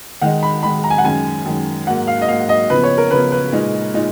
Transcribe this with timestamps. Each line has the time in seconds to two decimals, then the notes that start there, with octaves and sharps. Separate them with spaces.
0.21 D#3 G#3 D#4 F#5
0.43 B5
0.62 D#3 G#3 D#4 B5
0.84 A#5
0.90 G#5
0.98 F#5
1.04 F#2 D#3 G#3 C#4 G#5
1.45 F#2 D#3 G#3 C#4
1.87 G#2 F#3 A#3 F#5
2.07 F5
2.21 D#5
2.28 G#2 F#3 A#3 F5
2.49 D#5
2.70 C#3 F3 B3 B4
2.83 C#5
2.98 A#4
3.11 C#3 F3 B3 B4
3.32 B4
3.52 A#2 G#3 D#4
3.94 A#2 G#3 D#4